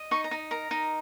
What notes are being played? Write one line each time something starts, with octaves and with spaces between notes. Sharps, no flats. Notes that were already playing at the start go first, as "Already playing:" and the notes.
Already playing: D#5
D#4 C#6
A#5
D#4
A#4 A#5
D#4